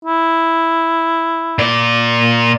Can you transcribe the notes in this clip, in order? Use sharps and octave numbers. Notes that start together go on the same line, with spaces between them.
E4
A#2 D5